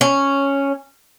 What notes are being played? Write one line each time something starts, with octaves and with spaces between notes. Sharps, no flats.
C#4